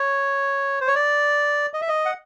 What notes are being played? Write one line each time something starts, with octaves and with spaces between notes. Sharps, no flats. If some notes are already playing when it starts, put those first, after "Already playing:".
Already playing: C#5
C5
C#5
D5
D#5
E5
D#5
F#5